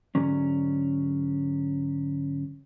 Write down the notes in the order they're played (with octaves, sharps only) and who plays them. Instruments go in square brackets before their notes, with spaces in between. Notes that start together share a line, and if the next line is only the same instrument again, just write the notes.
[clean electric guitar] G#2 D3 F#3 C#4